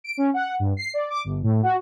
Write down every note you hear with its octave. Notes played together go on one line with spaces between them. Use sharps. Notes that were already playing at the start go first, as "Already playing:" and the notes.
D7
C#4
F#5
G2
C7
D5
D6
G1
A2
F#4